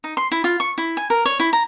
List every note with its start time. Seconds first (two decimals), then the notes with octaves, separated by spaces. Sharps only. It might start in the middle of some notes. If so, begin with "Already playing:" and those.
0.04 D#4
0.17 C6
0.32 E4
0.44 F4
0.60 C#6
0.78 E4
0.97 G#5
1.10 A#4
1.26 C#5
1.40 E4
1.53 A#5